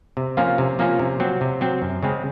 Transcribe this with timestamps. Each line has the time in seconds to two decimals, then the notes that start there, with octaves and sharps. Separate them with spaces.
0.17 C3
0.37 F3 A#3 C#4 F4
0.58 C3
0.79 F3 A#3 C#4 F4
0.99 C3
1.20 F#3 C4
1.41 C3
1.61 F#3 C4
1.82 F#2
2.03 C#3 G#3 C4